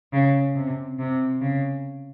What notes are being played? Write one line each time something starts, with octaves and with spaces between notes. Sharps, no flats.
C#3
C3
C3
C#3